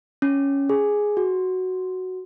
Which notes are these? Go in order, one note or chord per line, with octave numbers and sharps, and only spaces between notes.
C#4
G#4
F#4